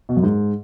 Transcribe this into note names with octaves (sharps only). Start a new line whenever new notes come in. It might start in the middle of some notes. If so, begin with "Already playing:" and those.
B2
F#2
G#2